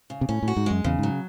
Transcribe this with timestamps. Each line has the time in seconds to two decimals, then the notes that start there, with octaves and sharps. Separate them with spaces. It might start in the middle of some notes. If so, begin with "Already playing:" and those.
0.10 C#3
0.21 C3
0.29 A2 C#4
0.43 A2
0.48 F#4
0.57 G#2
0.66 F#2 G#3
0.84 E2 C#3
0.99 G#2 F#3